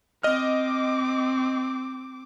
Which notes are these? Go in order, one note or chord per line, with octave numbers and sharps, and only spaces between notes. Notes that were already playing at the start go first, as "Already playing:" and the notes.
C4 D#5 D6 F6